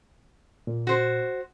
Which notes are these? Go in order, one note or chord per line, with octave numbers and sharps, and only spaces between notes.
A#2
F#4 C5